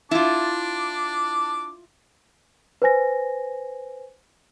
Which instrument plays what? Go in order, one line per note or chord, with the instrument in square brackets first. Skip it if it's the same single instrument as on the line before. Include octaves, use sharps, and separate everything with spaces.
[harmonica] D4 D6 [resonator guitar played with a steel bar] E4 F4
[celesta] B4 C5 G#5 A#6